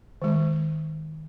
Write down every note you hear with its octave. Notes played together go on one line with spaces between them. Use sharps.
D#3 G#3